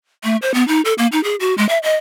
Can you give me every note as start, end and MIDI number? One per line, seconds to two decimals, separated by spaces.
0.24 0.37 57
0.42 0.52 72
0.54 0.66 59
0.68 0.81 63
0.85 0.93 69
0.98 1.07 58
1.12 1.23 63
1.24 1.35 68
1.40 1.55 66
1.58 1.67 56
1.69 1.78 76
1.83 1.97 75